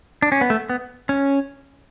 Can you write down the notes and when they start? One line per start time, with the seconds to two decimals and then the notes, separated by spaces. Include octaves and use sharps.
0.22 D4
0.32 C#4
0.41 B3
0.50 A3
0.69 B3
1.09 C#4